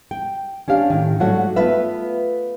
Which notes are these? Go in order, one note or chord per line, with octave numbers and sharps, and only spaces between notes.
G5
C#4 D4 G4 F5
A2 D#3
G#2 F#3 G3 A3 F#4 F#5
A3 B3 F4 B4 E5